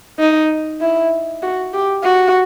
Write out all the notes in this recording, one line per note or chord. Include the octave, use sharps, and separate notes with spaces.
D#4
E4
F#4
G4
F#4